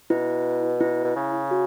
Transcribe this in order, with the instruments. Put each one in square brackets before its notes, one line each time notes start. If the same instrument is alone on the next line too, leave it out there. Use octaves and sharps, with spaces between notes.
[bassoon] B2 [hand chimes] E4
[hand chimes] E4
[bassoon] B2
C#3
[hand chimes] F#4